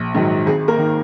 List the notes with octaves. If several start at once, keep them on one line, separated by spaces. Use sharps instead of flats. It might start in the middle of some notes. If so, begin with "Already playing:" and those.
Already playing: A#1
G#2 D#3 F#3
G#1 G#4
A#3 A#4
D#3